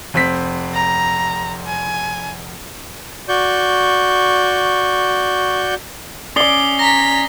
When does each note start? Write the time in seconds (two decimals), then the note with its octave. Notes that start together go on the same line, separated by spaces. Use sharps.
0.14 F1 C4 B6
0.74 A#5
1.67 G#5
3.28 F#4 D5 C#6 G6
6.36 C#4 D5 D6 D#6 C7 G7
6.79 A#5 A#6 B6